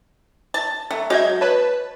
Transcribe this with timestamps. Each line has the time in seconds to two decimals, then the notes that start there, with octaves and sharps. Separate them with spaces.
0.54 A5
0.91 A3 A#5
1.10 F#3 G#3 D#5 E5 G6 G#6
1.41 B4 C#5 A5